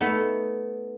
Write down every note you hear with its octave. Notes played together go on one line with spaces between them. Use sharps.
A3 B3 D#4